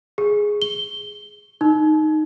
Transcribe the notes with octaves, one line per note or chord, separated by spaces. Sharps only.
G#4
G7
D#4